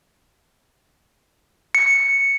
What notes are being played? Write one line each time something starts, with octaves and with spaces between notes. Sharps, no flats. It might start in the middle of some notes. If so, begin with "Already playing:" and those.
C#7